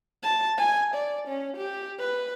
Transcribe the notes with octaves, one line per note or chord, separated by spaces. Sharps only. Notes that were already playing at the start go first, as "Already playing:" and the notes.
A5
G#5
D5
C#4
G4
B4